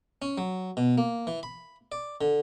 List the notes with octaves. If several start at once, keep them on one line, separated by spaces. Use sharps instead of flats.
C#4
F#3
B2
A#3
E3
B5
D5
D3